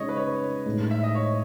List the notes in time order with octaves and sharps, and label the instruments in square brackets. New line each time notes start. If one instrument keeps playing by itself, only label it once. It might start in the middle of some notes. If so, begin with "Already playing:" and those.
Already playing: [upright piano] C#3 G#3 D#4 [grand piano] C#5 D#5
[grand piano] B4
C#5
[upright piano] A2 G#3 D#4
[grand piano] E5
D#5
C#5